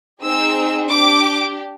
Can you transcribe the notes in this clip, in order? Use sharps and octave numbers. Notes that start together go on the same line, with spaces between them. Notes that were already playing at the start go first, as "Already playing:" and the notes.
C4 D#4 G#4 E6
D4 G4 D6